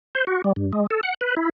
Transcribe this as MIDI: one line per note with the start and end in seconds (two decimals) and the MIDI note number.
0.15 0.25 72
0.27 0.42 66
0.44 0.53 55
0.56 0.72 43
0.73 0.86 56
0.90 1.01 69
1.03 1.14 78
1.21 1.35 71
1.37 1.49 64